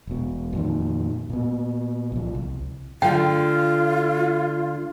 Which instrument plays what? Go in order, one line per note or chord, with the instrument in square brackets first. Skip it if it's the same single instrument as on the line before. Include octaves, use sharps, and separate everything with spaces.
[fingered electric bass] E1 B2
F2 A#2 D#3
A#2 B3
C2 F3
C2
[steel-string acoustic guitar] D3 A3 [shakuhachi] F4 [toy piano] G5